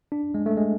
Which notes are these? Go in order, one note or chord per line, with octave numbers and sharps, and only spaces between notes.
D4
G#3
A3
G#3